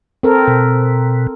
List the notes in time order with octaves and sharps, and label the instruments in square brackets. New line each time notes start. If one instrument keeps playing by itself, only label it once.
[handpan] C4 A4 A#4
[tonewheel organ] B2